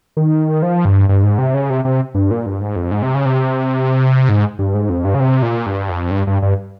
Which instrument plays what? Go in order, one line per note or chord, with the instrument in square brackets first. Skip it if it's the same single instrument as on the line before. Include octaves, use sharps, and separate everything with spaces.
[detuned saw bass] D#3
F3
G2
G2
G#2
C3
C#3
C3
C3
G2
A#2
G2
G#2
F2
G#2
C3
C#3
C3
G#2
G2
G#2
F2
G2
C#3
C3
A#2
G2
F2
G2
G2
G2